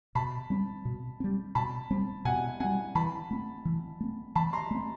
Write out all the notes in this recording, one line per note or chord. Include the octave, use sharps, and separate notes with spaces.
B2 A5 B5
G3 C4
B2
G3 C4
B2 A5 B5
G3 C4
B2 F#5 G#5
G3 C4 F#5 G#5
E3 A5 B5
A3 C4
E3
A3 C4
E3 A5 B5
A#5 C6
A3 C4